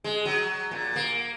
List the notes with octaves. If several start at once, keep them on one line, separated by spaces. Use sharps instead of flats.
G#3
F#3
A#2
A#3